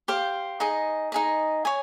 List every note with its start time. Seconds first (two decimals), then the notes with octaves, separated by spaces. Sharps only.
0.08 G4 C5 F5
0.60 D#4 G#4 D#5
1.12 D#4 G#4 D#5
1.65 C#5 G#5 D#6